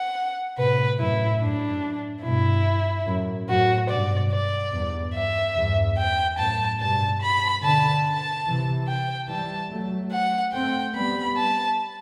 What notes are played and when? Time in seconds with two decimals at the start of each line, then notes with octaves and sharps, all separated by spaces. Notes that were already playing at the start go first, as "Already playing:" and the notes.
Already playing: F#5
0.58 A2 C3 B4
0.99 F#2 A2 E4
1.40 F#2 A2 D4
2.23 G2 B2 E4
3.06 F#2 A2
3.48 F#2 A2 F#4
3.90 G2 B2 D5
4.31 D5
4.73 E2 G2
5.15 E5
5.55 E2 G2
5.98 G5
6.38 F#2 A2 A5
6.80 G2 B2 A5
7.21 B5
7.63 B2 D3 A5
8.05 A5
8.46 C3 E3
8.88 G5
9.29 E3 G3 A5
9.70 F#3 A3
10.11 F#5
10.53 A3 C4 G5
10.94 G3 B3 B5
11.37 A5